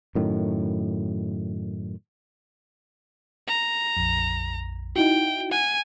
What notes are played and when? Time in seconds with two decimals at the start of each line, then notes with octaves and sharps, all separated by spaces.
0.15 F#2 A2 D#3
3.47 A#5
3.97 A#1 F2
4.96 D#4 E4 F#4 G5
5.51 F#5 G#5